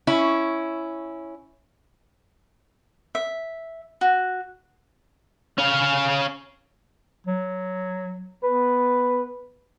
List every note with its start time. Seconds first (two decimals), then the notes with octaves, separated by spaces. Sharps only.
0.07 C#4 E4
3.15 E5
4.01 F#4
5.58 C#4 F5
7.27 F#3
8.44 B3 B4